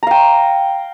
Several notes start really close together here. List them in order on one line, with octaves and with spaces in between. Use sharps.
A#5 F5 G5